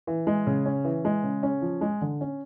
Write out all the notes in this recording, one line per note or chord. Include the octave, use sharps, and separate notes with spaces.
E3
G#3
C#3
C#4
E3
G#3
C#3
C#4
F3
G#3
D3
C#4